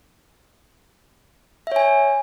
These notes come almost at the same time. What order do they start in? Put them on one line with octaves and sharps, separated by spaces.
E5 C#5 G#5